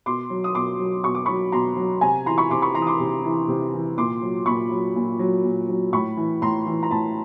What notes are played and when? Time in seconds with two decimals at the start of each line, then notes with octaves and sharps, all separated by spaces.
0.06 B2 C6 D6
0.30 F#3
0.44 D#6
0.55 B2 C6 D6
0.79 F#3
1.04 B2 C#6
1.15 D6
1.25 F#3 B5 C#6
1.52 B2 A#5 C6
1.76 F#3
2.01 C3 G#5 A#5
2.26 E3 A#5 C6
2.38 B5 C#6
2.50 C3 C6 D6
2.62 B5 C#6
2.74 E3 A#5 C6
2.82 D#6
2.87 C6 D6
3.00 C3
3.24 E3
3.48 C3
3.73 E3
3.97 A#2 C6 D6
4.22 F#3
4.46 A#2 B5 C#6
4.71 F#3
4.96 A#2
5.19 F#3
5.44 A#2
5.69 F#3
5.93 A2 B5 C#6
6.17 E3
6.42 A2 A#5 C6
6.66 E3
6.83 A#5
6.91 A2 A5 B5